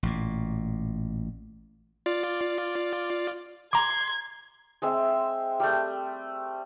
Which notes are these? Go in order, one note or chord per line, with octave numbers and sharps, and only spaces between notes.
A1 A#2
F4 D5
A#5 C6 D6 G#6
G#3 C4 E5
G3 A3